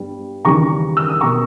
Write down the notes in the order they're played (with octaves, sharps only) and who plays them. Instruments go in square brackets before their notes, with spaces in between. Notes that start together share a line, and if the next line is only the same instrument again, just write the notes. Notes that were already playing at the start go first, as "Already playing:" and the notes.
Already playing: [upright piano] G2 G3 B3
D#2 C#3 E3 G3 A#5 C#6
E6
D#6
B2 A#3 A#5 C#6